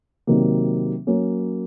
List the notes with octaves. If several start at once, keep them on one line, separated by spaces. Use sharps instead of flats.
C3 D#3 F#3 A#3
F#3 A#3 C#4